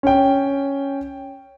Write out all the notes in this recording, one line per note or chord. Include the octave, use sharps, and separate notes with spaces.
C#4 G5